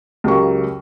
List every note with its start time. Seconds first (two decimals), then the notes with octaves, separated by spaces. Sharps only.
0.24 C#2 C#3 F#3 G4 A#4 C#6